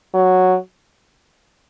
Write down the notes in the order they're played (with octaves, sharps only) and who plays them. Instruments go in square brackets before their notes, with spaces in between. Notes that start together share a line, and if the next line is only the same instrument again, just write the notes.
[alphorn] F#3